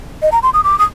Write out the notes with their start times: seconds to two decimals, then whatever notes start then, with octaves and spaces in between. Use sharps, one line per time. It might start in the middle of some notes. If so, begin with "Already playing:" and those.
0.22 D#5
0.32 A#5
0.43 C6
0.54 D#6
0.64 D6
0.79 D#6